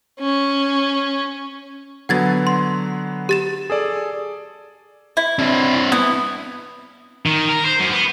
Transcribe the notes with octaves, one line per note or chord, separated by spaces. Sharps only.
C#4
D3 F#3 B3 F#5 G#6 A6
C6
G4 A6 E7
G#4 A4 D5
E4
C4 D4
B3 E4
D#3
A#4
C5
F#2
B3